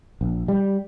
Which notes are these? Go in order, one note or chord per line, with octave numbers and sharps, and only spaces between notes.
A#1
G3